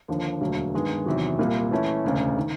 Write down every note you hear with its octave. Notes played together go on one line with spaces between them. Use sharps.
D#2 D3 F3
E1 D2 D3 F#3 A#3
G2 D#3 G#3 B3
E2 C3 D#3 F#3
C2 A#2 G3 A#3
E3 A3 C#4 E4
E1 D2 C#3
D#3